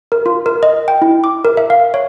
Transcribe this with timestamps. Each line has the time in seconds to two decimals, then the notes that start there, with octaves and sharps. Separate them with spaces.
0.12 A#4
0.26 F4
0.46 A#4
0.63 D#5
0.88 G5
1.02 E4
1.24 D6
1.45 A#4
1.57 E5
1.70 F5
1.94 C#5